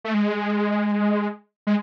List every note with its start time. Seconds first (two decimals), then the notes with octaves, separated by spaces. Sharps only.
0.04 A3
0.14 G#3
1.67 G#3